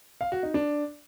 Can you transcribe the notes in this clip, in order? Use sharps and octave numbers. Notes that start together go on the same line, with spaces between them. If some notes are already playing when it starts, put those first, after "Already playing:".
F5
F#4
D#4
D4